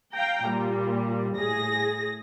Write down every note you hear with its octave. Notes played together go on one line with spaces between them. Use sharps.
F5 G5 A#5
A#2 G3
A2 G#4 A#6